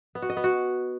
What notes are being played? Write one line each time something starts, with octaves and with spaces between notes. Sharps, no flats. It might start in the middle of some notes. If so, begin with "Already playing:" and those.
B3
F#4
D#5
B3
F#4